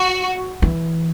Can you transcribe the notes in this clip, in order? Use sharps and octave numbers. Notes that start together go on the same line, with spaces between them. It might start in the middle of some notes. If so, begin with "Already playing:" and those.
Already playing: F#4
E3